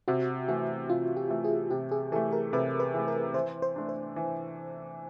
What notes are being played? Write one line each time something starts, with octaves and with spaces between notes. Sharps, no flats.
C3 F#4
E3 A3 F#4
C3 F4
G4
E3 A3
G#4
C3 G4
G#4
E3 A3 A4
A#4
C3 B4
B4
E3 A3
A#4
E3 C5
C5
A3 D4
C5
E3